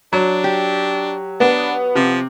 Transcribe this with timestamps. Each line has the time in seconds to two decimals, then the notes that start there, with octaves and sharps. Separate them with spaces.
0.13 F#3 D4
0.44 G4
1.40 B3 D4
1.95 C3 F3